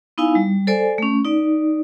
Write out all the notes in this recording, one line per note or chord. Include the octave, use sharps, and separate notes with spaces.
B3 D#4 E4 F5 G#5
G3
A4 C5 D5 G#5
A3 C#4
D#4 D5